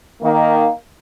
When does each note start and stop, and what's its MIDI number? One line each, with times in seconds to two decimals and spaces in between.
0.23 0.68 51
0.23 0.68 58